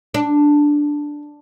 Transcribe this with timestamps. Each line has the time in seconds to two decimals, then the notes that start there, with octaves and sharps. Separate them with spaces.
0.14 D4